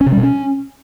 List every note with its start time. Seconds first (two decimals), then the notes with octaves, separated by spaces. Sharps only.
0.01 C#4
0.06 C3
0.12 G3
0.17 B2
0.23 C#4